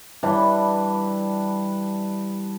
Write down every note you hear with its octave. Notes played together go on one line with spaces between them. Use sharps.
E3 G3 D4